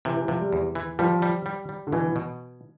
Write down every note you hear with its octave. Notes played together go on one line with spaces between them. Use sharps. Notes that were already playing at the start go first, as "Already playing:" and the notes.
C3 E3
E3
C3 F3
G3
E2
E3
F3 G3
G3
G3
G3
D3
B2 E3
B2